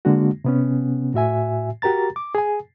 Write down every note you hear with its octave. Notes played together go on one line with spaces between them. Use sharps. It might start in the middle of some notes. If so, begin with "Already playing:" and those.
D3 G#3 A#3 D4 F#4
C3 B3 C#4
A2 F#4 E5 G#5
F#4 G4 A#4 A#5 A6
D6
G#4 G#5